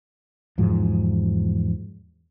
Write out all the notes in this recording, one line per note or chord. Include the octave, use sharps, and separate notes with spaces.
E2 G#2 F3 F#3